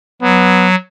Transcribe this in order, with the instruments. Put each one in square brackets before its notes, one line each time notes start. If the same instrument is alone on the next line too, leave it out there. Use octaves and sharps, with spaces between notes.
[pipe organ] F#3 [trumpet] B3